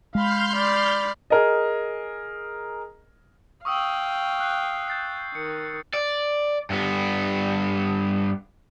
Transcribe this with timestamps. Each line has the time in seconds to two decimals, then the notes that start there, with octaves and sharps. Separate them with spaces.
0.15 G#3 F5 B5 C6 F6 G6
0.56 D5 B5
1.30 G#4 A#4 D#5
3.65 F5 G5 C#6 D#6 E6
4.40 F#6 C7
4.88 G6 A6 C7
5.35 D#3 C#7
5.94 D5
6.70 G2 B3